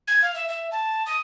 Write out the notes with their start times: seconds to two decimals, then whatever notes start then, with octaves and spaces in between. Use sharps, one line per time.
0.08 G#6
0.22 F5
0.34 E5
0.49 E5
0.72 A5
1.06 D#6